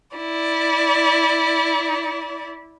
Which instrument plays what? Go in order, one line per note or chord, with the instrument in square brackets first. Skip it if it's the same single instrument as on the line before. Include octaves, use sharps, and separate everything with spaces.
[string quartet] E4 D5